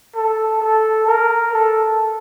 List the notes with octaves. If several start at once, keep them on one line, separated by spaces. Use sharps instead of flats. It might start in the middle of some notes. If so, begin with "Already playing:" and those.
A4
A4
A#4
A4